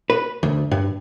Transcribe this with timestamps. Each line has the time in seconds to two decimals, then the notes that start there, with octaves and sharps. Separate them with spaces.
0.10 B4
0.43 D2
0.71 G2